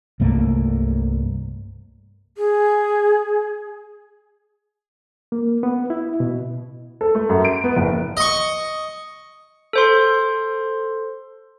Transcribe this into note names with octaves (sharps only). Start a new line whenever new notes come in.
C2 G2 A3 A#3
G#4
A#3
B3
E4
B2
A4
A3
F#2
D7
B3
F#1
D#5 C#6
A4 C5 C6